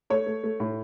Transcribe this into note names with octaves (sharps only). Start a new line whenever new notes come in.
A3 C#5
A3
A3
A2